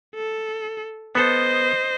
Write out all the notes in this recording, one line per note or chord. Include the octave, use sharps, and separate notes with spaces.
A4
B3 A4 C5 D#5